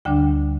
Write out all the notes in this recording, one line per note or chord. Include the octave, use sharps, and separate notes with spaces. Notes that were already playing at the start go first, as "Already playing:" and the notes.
D2 D3 G3 D4 G5